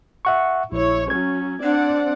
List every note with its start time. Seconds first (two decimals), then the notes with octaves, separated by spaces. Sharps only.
0.25 E5 F#5 C#6
0.72 A#1 E4 C#5
1.10 F#3 C#4 G#6
1.63 C4 D4 D5 F#5